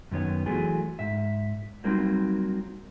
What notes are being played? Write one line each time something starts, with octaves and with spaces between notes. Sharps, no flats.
F#2 D#3 B3 C#5
E3 F#3 A3 F4 G#4
G#2 E5
F#3 G3 A#3 C4 D#4 F4